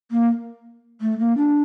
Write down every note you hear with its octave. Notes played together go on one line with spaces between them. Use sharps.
A#3
A3
A#3
D4